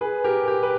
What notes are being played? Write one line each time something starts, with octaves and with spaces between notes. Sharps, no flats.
G#4 B4
G4 A#4
G4
B4